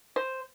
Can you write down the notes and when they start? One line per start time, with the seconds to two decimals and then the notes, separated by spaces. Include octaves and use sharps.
0.16 C5